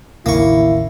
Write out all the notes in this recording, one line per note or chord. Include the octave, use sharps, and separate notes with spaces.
A1 D#2 C#3 A#3 E4 C#6